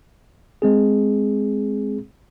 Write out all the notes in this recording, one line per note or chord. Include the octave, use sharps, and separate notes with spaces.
G#3 C4 G#4